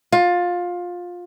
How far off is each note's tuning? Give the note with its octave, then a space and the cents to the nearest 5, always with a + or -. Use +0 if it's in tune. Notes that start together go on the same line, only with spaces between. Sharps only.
F4 +20